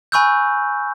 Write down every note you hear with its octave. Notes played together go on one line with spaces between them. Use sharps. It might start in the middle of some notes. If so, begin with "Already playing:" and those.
G#5 B5 C#6 E6 F#6 G6